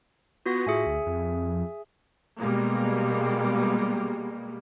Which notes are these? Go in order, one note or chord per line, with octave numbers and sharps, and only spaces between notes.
B3 F4 F#4 A#6
A2 G#4 E5 G#5
D2
F2
B2 G3 G#3 A#3